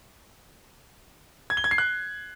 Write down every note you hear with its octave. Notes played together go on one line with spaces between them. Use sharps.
G#6
G7
G#6
C7
F#6